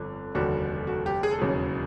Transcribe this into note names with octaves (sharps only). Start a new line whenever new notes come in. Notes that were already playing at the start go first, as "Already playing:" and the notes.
Already playing: G1 F2 D3 F3
F1 D#2 D3 G3 F#4
F#4
G4
G#4
A4
E1 D#2 C#3 F#3 G#4